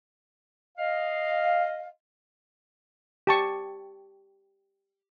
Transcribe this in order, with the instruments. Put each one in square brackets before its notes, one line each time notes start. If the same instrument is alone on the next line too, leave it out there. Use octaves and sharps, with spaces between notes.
[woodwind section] D#5 F5
[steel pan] G4 A5 C#6